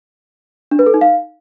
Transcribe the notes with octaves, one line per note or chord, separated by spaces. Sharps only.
D4
B4
A4
D#4
F5